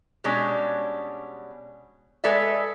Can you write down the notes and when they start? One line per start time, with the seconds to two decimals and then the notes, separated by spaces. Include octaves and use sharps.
0.24 B2 G3 G#3 C#4 D4
2.24 G#3 A4 B4 D5 E5